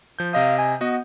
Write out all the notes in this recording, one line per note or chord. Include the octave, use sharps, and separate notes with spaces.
F3 G6
C3 D#5 F5 D#6
G#5
B3 F#4 D#5